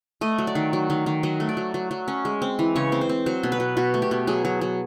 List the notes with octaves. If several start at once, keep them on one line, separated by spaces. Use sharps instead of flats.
A3 D#5
F#3
D5
D#3
F#3
D#3
D#3
F#3 D#5
A3
D5
F#3
F#3
F#3
C#4
G#3
C4
E3
C#3 C#5
C4
C5
C4
F#3 C5
B2
B4
B2
B2 F#4
A3
G4
B2
F#3 G#4
F#3
F#3